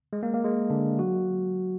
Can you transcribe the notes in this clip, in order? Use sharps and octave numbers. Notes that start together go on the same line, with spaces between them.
G#3
A#3
A#3
G#3
D3 D4
F#3 F#4